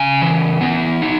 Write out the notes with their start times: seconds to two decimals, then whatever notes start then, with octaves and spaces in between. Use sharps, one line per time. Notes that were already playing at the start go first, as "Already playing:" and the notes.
Already playing: C#3 G#5
0.22 E3
0.61 B3
1.02 D#4